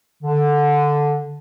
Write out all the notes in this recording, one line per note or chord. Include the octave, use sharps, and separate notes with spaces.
D3